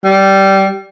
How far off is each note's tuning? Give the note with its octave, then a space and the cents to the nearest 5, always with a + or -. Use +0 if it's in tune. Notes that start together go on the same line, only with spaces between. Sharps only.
G3 -15